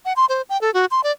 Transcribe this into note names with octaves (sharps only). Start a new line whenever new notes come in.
F#5
C6
C5
G5
A4
F#4
C6
D5